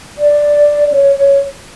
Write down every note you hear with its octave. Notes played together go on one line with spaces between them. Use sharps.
D5
C#5
C#5